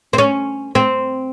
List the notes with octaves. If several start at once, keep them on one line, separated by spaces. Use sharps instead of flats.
C4
C#4
C4